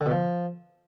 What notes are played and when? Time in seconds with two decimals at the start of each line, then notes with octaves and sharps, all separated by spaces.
0.01 D3
0.06 B2
0.11 F3